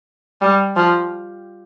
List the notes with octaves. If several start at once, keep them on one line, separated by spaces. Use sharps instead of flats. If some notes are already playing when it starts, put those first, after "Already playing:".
G3
F3